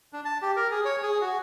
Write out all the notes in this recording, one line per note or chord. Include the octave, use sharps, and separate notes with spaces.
D4
A5
G4
A#4
G#4
C#5
G#4
F#4